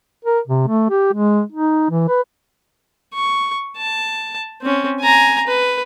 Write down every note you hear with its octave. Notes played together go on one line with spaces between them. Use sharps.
A#4
C3
A3
G4
G#3
D#4
E3
B4
C#6
A5
C4 C#4
G#5 A#5
B4